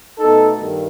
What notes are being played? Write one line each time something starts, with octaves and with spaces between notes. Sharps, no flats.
B2 A3 D#4 A4
G2 D#3